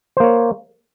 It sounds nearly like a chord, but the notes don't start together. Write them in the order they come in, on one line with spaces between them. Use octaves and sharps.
C5 A#3 C#5